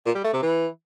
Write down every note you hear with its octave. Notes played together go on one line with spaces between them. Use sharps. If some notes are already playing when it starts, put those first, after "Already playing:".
A#2
G3
A3
C3
E3